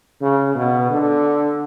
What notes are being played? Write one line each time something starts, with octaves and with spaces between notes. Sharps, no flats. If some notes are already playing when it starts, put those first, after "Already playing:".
C#3
B2
D3